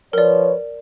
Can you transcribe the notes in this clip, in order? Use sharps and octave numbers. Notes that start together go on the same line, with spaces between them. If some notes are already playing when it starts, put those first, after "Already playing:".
F3 A#4 B4 C#5 D5